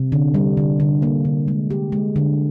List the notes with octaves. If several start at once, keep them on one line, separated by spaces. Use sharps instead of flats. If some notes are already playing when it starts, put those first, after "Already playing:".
Already playing: C3
D3
G3
D3
D3
A#3
D3
G#3
G4
G#3
D3